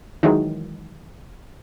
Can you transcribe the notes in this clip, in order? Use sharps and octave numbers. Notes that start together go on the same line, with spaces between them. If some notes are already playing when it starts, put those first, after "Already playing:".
D#3 E3 F#3 G#3